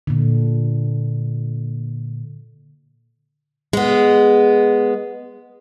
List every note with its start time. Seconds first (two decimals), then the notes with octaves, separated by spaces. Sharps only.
0.07 A#2 D3
3.73 G#3 B3